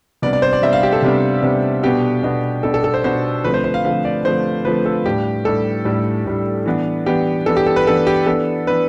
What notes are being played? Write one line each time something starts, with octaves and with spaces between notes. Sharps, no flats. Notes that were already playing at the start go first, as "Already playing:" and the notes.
C3 G3 B3 D4 D5
D5
C5
D5
C3 G3 B3 D4 E5
F5
G4
A4
C3 G3 B3 D4
C3 G3 B3 D4
B2 B3 D4 G4
B2 B3 D4
B2 B3 D4 A4
A4
A4
C5
B2 B3 D4 C5
D3 F3 A3 C4 B4
C5
C5
F5
D3 F3 A3 C4 F5
D5
D3 F3 A3 C4 C5
D3 F3 A3 C4 B4
A4
A2 G3 D4 G4
A2 G3 D4 A4
A2 G3 D4
A2 G3 D4
E3 B3 D4
E3 B3 D4 G4
E3 B3 D4 A4
G4
A4
B4
E3 B3 D4 A4
G4
E3 B3 D4 A4
E3 B3 D4 B4